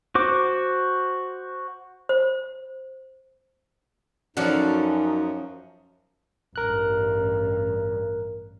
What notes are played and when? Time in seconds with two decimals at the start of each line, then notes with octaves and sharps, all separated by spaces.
0.15 F#4 C5 D6
2.09 C5
4.37 F#2 F3 C#4 D#4 F#4 A4 D5
6.56 A1 G2 A#4 F#6